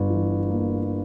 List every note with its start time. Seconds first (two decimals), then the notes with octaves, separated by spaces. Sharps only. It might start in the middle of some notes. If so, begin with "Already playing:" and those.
Already playing: G1
0.10 E3
0.49 A#3